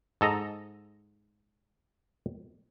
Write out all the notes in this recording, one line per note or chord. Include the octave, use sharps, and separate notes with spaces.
G#2 A4 D#5 A#5